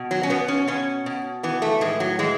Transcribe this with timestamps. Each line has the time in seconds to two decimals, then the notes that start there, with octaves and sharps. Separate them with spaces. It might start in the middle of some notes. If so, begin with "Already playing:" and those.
Already playing: B2
0.11 F#3
0.23 C#4
0.30 B2 B3
0.48 C#4
0.68 B2 C#4
1.06 B2
1.43 E3 B3
1.62 A3
1.81 A2 G#3
2.00 F#3
2.19 E3 G#3